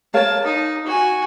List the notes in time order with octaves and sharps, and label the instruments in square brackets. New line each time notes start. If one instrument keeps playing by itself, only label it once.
[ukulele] A#4 C#5 F5 [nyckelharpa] A5
[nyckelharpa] D#4
F#4 G#5